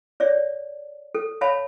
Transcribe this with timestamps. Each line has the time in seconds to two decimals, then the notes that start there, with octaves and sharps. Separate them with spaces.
0.20 C#5 D5 E5
1.15 A4
1.41 C#5 E5 F5 A5 B5